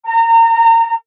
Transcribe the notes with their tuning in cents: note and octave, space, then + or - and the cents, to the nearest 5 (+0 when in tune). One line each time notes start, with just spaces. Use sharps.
A#5 -30